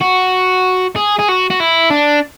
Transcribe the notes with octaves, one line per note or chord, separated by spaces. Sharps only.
F#4
G#4
G#4
F#4
F#4
E4
D4